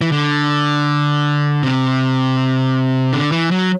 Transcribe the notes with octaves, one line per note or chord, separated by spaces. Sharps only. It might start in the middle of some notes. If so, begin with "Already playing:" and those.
E3
D3
C3
D3
E3
F#3